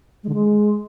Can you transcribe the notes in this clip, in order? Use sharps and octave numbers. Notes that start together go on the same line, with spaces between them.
G#3
D3
G#3